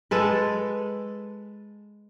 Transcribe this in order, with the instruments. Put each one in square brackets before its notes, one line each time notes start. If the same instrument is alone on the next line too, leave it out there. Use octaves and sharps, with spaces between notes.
[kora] G#3 A4 B4